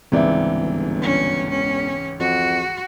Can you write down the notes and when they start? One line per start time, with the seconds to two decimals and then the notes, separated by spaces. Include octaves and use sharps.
0.12 G1 C#2 G#2 E3 C4 D5 E5
1.02 C#4
1.50 E1 C#4
2.20 F2 F#4